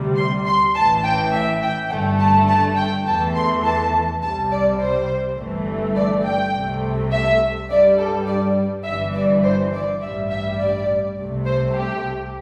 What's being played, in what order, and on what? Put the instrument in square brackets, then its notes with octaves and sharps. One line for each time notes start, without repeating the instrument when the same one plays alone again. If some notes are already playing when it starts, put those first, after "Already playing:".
Already playing: [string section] D2 C3 G3
C6
C6
A1 A2 E3 A5
G5
E5
G5
G1 G2 D3 A3 G5
A5
A5
G5
E2 E3 A3 A5
C6
A5
C2 C3 G3 A5
D5
C5
G1 G2 E3 A3
D5
G5
C2 C3 A3
E5
G2 G3 D5
A4
D5
G1 G2 E3 E5
D5
C5
D5
A1 G2 G3 E5
E5
D5
C2 C3 A3
C5
G4